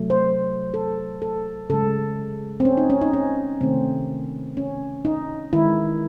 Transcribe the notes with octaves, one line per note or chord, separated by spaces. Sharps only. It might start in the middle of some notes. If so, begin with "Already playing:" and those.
Already playing: C3 F#3 A3
C5
A4
A4
C#3 G#3 A4
C4
C#4
D#4
C#4
D#4
C#4
C3 D#3 A3 C4
C#4
D#4
D#3 G#3 E4